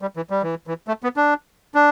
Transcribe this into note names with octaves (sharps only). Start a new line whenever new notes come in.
G3
E3
G3
E3
E3
A3
B3
D4
D4